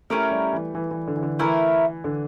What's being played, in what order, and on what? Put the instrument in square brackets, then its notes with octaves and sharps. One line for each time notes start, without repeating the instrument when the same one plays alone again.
[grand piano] A3 [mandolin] C#4 E4 G4 A#4
[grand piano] G3
E3
E3
E3
D3
E3
D3
[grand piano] E3 [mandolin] A3 E4 A#4
[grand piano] D3